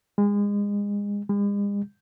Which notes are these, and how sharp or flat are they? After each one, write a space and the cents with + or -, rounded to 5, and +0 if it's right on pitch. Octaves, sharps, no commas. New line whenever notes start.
G#3 -30
G#3 -45